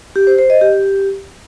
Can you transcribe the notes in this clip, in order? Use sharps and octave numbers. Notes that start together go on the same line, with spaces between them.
G4
C5
C5
D#5
G4